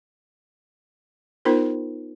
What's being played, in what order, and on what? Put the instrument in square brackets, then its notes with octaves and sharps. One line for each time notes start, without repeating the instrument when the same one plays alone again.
[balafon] B3 D#4 F4 A#4 C5